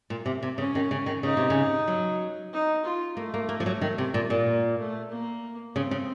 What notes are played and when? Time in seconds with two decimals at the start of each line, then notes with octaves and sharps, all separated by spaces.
0.10 A#2
0.26 C3
0.43 C3
0.58 C#3 C#4
0.75 D#3
0.91 C#3
1.06 D#3
1.23 C#3 D#4
1.37 C3
1.50 C#3
1.88 F#3
2.53 D#4
2.84 F4
3.17 A3 A#3
3.34 A#3
3.49 A#3
3.60 F3
3.66 F#3
3.81 D#3
3.98 C3
4.14 A#2
4.30 A#2
4.46 A#3
4.78 A3
5.11 A#3
5.76 C#3 C4
5.91 C#3